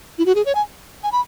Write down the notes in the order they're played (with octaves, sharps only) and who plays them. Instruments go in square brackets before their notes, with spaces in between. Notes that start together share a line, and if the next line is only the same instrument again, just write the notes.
[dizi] E4
F#4
G#4
C#5
G#5
G#5
B5